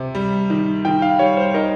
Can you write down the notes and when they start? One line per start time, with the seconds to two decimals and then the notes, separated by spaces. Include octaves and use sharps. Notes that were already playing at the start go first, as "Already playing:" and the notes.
Already playing: C3
0.15 G3
0.50 D#3
0.85 D#3 G5
1.02 F5
1.19 G3 C#5
1.37 C5
1.54 D#4 A#4